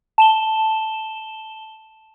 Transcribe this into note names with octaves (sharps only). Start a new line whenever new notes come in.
A5 E7 G7